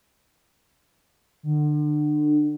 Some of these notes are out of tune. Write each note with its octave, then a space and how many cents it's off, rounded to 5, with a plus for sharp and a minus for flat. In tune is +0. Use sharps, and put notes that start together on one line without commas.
D3 +30